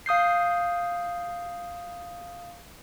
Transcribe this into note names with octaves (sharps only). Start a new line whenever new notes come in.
F5 D#6 G6 C7